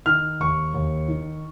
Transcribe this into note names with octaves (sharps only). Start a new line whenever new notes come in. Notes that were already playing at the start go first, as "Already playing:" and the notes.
D#3 F6
D#2 C#6
D#2
D#3